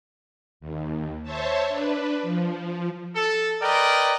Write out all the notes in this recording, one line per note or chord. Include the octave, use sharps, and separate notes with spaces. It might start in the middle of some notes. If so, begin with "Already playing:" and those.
D#2
C5 C#5 E5 A5
D4 B4
F3
A4
A#4 B4 D5 D#5 G5